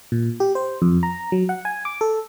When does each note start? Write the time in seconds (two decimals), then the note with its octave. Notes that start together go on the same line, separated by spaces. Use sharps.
0.12 A#2
0.40 G4
0.55 C5
0.82 F2
1.03 A#5
1.32 F#3
1.49 F#5
1.65 G#5
1.85 D6
2.01 A4